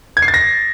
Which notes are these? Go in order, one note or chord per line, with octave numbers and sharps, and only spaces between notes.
G#6
C7
A6
A#6